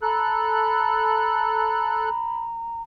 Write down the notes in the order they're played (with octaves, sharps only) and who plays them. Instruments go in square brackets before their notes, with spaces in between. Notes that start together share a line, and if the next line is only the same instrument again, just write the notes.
[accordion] A4 F#6 [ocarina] A#5 [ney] B5